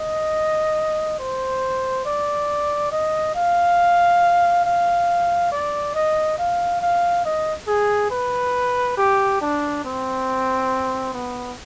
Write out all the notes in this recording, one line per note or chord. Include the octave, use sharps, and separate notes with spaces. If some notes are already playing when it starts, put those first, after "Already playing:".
Already playing: D#5
C5
D5
D#5
F5
F5
D5
D#5
F5
F5
D#5
G#4
B4
G4
D4
C4
B3